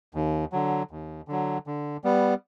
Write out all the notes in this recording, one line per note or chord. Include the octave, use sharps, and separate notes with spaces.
D#2
D3 F#3
D#2
D3 F#3
D3
G3 B3